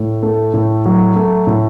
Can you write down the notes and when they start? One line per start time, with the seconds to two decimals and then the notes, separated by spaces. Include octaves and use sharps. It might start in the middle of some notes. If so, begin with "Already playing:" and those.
Already playing: A2
0.23 A3
0.54 A2
0.86 F#3
1.16 A3
1.47 A2